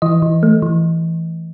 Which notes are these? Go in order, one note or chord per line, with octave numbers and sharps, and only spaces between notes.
E3 D#5
E3
A3
E3